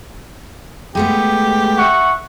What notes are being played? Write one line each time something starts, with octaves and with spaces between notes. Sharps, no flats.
G#3 A3 B3 G4
E5 F#5 C#6